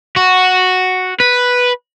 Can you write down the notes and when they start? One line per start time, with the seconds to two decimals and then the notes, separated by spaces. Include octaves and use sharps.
0.16 F#4
1.20 B4